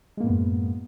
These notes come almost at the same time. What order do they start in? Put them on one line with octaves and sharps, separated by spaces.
G#3 A#3 A2 B3 F#2